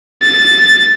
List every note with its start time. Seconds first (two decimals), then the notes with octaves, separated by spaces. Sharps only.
0.23 A6